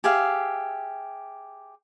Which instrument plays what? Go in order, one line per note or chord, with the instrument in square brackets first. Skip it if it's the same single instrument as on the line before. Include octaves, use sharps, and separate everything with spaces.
[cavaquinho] G4 G#4 E5 F5